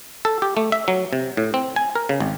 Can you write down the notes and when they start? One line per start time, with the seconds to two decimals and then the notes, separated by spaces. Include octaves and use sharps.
0.25 A4
0.42 G4
0.57 A3
0.72 E5
0.88 F#3
1.13 C3
1.37 A2
1.54 C4
1.76 G#5
1.95 A#4
2.09 C#3
2.20 G#1